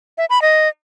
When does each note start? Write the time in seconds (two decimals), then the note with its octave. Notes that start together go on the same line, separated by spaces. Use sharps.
0.18 E5
0.30 B5
0.42 D#5